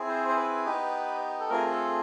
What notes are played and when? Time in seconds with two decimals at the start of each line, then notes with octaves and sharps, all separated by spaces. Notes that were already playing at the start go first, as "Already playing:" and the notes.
Already playing: C4 E4 G#4
0.09 C5
0.28 C5
0.37 B4
0.65 B3 D#4 G4
1.40 A4
1.50 A3 C4 F4 G#4 A#4
1.71 A4